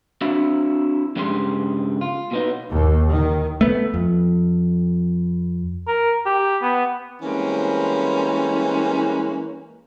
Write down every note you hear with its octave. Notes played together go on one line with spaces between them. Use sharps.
C4 D4 E4 F#4 F5
G2 C#3 G3 G#3 A#4 C6
F4
B2 B3 D#4
D#2
D#3
A3 B3
F2
A#4
G4
B3
E3 G3 G#3 A#3 C4 C#4